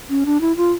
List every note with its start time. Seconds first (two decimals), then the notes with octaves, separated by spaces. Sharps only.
0.10 C#4
0.26 D4
0.41 E4
0.57 F4